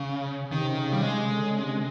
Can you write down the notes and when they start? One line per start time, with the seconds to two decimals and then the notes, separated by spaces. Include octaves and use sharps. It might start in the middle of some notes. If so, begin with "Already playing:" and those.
Already playing: C#3
0.52 C3 D#3
0.65 C#3
0.77 C#3
0.89 C#3
0.92 G3
1.02 C3 G#3
1.15 C#3
1.27 D3
1.40 C#3
1.52 C3